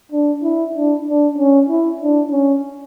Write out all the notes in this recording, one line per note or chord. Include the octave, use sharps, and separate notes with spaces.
D4
E4
D4
D4
C#4
E4
D4
C#4